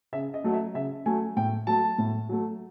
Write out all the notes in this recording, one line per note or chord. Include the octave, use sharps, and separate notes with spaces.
C#3 E5
D#5
F#3 A3
E5
C#3 E5
F#3 A3 G#5
A2 G5
F#3 A3 A5
A2
F#3 A3